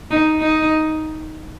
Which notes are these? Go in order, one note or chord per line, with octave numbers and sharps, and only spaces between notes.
D#4
D#4